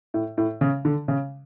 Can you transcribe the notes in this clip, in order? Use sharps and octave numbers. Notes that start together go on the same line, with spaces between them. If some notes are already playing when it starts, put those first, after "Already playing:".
A2
A2
C#3
D3
C#3